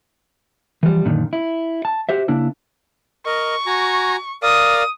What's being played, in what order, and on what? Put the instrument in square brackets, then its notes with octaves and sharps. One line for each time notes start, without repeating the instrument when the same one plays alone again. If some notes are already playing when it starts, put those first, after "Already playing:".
[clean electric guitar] E3 F3 G3
F#2 A#2 D3 D#3
E4
A5
F#4 G4 C5 E5
C#3 A#3 D4 E4
[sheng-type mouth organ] A#4 D#5 [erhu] C#6
[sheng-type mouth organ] F#4 G#5 A#5
[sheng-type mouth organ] A#4 D5 F5 [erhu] D#6